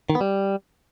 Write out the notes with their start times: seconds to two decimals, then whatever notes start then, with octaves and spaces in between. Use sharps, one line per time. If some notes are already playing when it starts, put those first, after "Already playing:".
0.10 D#3
0.15 B3
0.21 G3